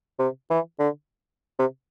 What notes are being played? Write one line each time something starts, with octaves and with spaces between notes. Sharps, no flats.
C3
E3
D3
C3